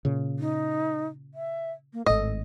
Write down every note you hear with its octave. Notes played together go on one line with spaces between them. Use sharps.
A#2 C#3
D#4
E5
A#3
G#1 A2 A4 D#5